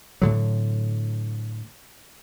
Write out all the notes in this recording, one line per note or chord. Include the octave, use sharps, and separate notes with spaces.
A2 D3 F#3